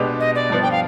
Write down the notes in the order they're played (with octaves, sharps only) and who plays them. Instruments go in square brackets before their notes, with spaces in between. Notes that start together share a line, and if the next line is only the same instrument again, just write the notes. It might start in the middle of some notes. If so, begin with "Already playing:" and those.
Already playing: [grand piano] B2 G#3 B3 D4 G4
[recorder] D#5
D5
[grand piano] G2 F3 B3
[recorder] G5
F5